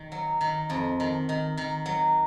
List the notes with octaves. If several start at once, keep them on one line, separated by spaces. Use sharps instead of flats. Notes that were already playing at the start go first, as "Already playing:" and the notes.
Already playing: D#3
F#3
D#3
F2
D#3
D#3
D#3
F#3